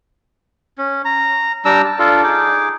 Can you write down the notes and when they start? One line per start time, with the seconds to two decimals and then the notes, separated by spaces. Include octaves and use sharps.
0.78 C#4
1.05 A#5
1.65 G3 D4 A#5 E6
1.85 A5
1.99 D4 F4 A4
2.23 D#4 G#4 D6